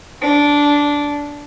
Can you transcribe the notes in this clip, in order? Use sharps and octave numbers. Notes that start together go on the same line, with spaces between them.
D4